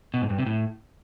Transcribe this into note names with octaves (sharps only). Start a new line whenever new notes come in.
B2
G#2
G2
C3
A2